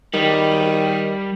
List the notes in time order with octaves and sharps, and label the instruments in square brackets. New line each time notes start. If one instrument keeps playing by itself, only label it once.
[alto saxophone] D#3 [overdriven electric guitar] G3